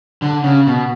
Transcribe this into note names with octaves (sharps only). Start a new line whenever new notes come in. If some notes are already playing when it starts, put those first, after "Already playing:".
D3
C#3
B2